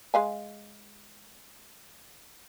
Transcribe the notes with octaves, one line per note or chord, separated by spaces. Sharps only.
G#3 F5 G#5